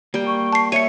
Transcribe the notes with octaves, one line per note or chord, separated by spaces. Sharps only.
G3 A#3 G5
C#6
A5 C7
C#5 E5 C#7 D#7